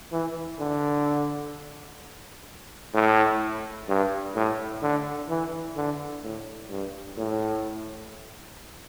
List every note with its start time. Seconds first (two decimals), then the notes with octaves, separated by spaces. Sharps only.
0.12 E3
0.59 D3
2.94 A2
3.89 G2
4.35 A2
4.82 D3
5.29 E3
5.76 D3
6.23 A2
6.70 G2
7.17 A2